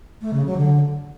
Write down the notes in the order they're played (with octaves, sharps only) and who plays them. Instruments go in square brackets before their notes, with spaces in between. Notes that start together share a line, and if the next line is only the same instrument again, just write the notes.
[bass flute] A3
C#3
F#3
D3